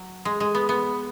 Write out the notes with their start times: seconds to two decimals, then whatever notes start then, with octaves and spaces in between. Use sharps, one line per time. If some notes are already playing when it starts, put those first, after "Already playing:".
Already playing: F#3
0.25 G#3
0.40 G#3
0.55 B3
0.69 B3